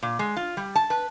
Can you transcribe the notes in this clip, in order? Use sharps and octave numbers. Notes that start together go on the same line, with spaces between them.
A#2
G#3
F4
G3
A5
B4